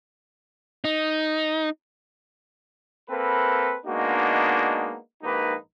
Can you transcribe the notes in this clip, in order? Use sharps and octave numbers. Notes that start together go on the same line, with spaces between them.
D#4
A#3 C4 A4 B4
G#3 A#3 B3 D4 D#4 F#4
A#1 G#2 A#3 D#4 G4 B4